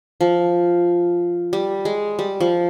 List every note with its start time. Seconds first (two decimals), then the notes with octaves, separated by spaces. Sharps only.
0.21 F3
1.53 G3
1.85 G#3
2.19 G3
2.40 F3